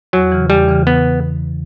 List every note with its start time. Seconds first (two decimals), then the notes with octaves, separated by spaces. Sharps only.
0.13 E2 F#3
0.32 C#3 E3
0.50 E2 G3
0.68 C#3 E3
0.87 B3